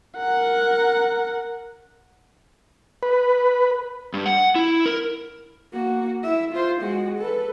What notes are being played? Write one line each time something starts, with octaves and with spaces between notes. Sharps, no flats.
A#4 F#5
B4
G2
F#5
E4
A#4
A#3 F#4
E4 E5
F4 C5
G#3 F#4
A4 B4